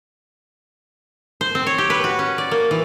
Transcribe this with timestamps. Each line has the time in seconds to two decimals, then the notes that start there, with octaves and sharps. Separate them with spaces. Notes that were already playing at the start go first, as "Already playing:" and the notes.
1.41 C5
1.55 C4
1.67 C#5
1.78 G4
1.90 B4
2.04 F#4
2.19 C#4
2.38 D5
2.51 A#3
2.71 E3